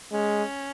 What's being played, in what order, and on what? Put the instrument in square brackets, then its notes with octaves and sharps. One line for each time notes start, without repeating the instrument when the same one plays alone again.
[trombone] G#3 [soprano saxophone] C#4